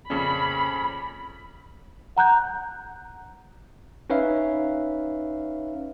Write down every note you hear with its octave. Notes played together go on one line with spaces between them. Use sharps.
F2 A#2 C#3 C#4 B5
F#5 A#5 F#6 G6
C#4 D#4 B4 C#5 E5 F5